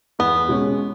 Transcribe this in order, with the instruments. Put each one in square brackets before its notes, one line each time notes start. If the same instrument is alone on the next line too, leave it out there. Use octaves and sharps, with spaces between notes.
[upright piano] E2 [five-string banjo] B3
[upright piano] B2 G#3 C#4